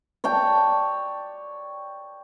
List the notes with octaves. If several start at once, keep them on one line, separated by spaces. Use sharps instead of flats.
C#5 D5 G5 A5